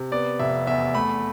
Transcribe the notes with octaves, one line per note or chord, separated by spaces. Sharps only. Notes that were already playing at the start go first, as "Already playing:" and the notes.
Already playing: C3
B3 D5
F1 E5
E2 E5
A3 B5